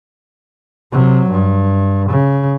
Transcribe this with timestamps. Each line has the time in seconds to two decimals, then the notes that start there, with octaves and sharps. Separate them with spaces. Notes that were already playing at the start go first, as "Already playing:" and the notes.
0.92 C3 F#3
1.30 G2
2.10 C#3